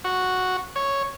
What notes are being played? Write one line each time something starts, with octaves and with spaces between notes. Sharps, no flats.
F#4
C#5